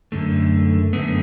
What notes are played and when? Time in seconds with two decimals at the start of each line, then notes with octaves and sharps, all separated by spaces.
0.12 F#2 D3 A3
0.93 F#2 D3 A3 B3